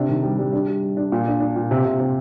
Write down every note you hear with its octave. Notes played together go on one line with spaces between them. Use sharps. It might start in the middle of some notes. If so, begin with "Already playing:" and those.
Already playing: C3 D4
D#3
G3
G3
D4
G3
G3
D4
A#2
D4
D4
A#2
C3
C3
C3